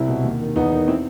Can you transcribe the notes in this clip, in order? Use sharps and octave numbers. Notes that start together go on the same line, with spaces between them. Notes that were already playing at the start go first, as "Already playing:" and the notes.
Already playing: C2 C4 E4
B2
D#2
D#3
E2 B3 D#4
D#3
C4 E4